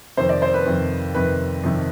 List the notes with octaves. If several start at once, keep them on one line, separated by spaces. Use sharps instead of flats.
F2 C3 D#3 C5
D5
C5
B4
F2 C3 D#3
F2 C3 D#3 B4
F2 C3 D#3